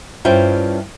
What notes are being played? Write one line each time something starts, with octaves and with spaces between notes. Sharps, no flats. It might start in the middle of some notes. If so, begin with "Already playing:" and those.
G2 C#4 E4 F4 C5 G5